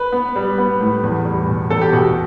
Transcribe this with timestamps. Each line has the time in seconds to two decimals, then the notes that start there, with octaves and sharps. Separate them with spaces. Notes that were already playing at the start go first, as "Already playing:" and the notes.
Already playing: B4
0.12 B3
0.36 G3
0.58 B3
0.81 A2
1.03 E2
1.25 G3
1.48 B2
1.70 E2 A4
1.81 G4
1.93 B2 F#4